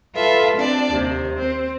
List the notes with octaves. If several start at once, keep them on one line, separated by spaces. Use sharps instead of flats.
F4 A4 B4 E5
C4 D4 D5 A5
D#2 C3
C4